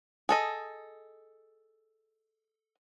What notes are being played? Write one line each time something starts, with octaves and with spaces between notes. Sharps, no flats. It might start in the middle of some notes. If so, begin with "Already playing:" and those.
G#4 A4 D#5